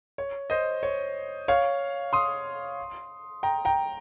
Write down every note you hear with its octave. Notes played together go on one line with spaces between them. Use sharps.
C#5
C5 D#5
C#5
C#5 F5
C6 D#6
G5 A#5
G5 A#5